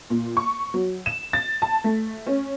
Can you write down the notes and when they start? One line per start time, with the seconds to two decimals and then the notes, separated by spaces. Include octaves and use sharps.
0.10 A#2
0.37 C#6
0.74 F#3
1.06 E7
1.33 A6
1.62 A5
1.84 A3
2.27 C#4